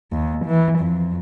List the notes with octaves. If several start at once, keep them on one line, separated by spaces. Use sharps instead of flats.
D#2
E3
F2